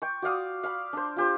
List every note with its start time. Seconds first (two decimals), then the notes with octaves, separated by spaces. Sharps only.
0.02 G5 C#6
0.22 F#4 D5 F5 D#6
0.63 F5 B5
0.93 D4 C5
1.16 F4 G4 C5